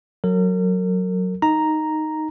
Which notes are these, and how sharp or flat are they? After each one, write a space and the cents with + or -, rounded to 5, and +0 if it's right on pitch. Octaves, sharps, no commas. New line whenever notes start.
F#3 -5 A#4 -35
D#4 +0 A#5 +0